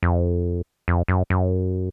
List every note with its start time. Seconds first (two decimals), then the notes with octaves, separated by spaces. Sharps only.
0.03 F2
0.88 F2
1.08 F#2
1.30 F#2